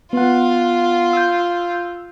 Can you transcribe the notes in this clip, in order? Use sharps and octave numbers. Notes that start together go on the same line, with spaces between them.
B3 F4 F#5
E6 G6